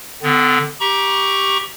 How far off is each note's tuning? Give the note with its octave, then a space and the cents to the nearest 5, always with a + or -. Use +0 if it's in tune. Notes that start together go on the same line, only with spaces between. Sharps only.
D3 -5 B3 +40
G4 +0 A#5 +25 C#6 +0